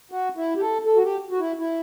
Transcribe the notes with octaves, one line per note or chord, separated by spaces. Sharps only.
F#4
E4
G4
A4
A4
F#4
G4
F#4
E4
E4